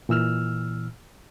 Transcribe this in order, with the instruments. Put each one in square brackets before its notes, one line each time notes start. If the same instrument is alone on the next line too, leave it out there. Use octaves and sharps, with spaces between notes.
[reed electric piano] A#2 E3 E6 F6